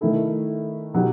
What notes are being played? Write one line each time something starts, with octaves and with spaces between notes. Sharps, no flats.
D#3 A3 E4 A4
B2 F#3 B3 D#4 G4